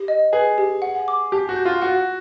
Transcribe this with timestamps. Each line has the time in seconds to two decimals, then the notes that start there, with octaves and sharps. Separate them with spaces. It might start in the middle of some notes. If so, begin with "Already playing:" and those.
Already playing: G4
0.08 D#5
0.33 G#4 B4
0.58 G4
0.82 F#5
1.08 D6
1.32 G4 A5
1.49 F#4
1.56 G6
1.65 F4
1.82 F#4 F#5